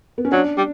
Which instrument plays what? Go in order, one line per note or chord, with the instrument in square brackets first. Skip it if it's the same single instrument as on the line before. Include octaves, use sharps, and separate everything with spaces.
[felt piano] B3
C#4
[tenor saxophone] F#3 [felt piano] D4
[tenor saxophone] G3